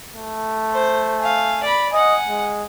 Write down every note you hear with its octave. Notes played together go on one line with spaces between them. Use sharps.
A3
C5
F5 G#5
D5 B5
D#5 F#5 G#5
G#3